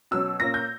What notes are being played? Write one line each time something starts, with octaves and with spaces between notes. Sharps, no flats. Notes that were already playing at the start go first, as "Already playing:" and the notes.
B2 F#3 C#4 E6
A#2 A#3 C#4 A#6
G6